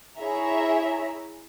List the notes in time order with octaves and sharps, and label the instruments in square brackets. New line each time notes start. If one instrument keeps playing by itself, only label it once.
[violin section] E4 G#4 C#5 E5 A#5